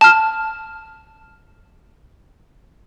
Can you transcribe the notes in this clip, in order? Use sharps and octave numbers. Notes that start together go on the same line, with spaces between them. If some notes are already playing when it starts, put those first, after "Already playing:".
A5 F6